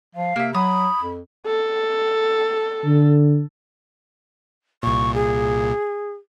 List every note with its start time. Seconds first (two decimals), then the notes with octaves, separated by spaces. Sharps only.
0.15 F3 F5
0.36 C3 A#3 E5
0.55 F#3 B5 D#6
1.00 F2
1.46 A4
2.85 D3
4.83 C2 A#2 C#6
5.15 G#4